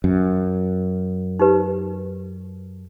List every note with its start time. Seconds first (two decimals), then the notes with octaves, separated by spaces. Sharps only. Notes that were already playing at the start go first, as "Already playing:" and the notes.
0.04 F#2
1.40 D#4 G4 B4